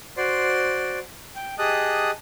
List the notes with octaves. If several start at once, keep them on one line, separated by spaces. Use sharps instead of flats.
F#4 C5 D5 C6
G5
G4 G#4 D#5 A5 D#6 F#6